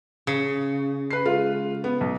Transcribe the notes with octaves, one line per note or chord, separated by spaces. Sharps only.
C#3
B4 C7
G#3 F4
B3
B1